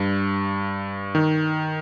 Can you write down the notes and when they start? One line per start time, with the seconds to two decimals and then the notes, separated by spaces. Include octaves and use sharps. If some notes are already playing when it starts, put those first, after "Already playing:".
Already playing: G2
1.15 D#3